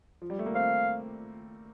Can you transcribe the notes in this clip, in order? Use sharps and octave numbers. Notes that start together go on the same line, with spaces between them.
F3
G3
A3
A#3
C4 F5